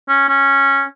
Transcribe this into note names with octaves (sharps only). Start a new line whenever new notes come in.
C#4
C#4